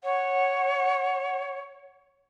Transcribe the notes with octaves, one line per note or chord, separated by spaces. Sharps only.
C#5 F#5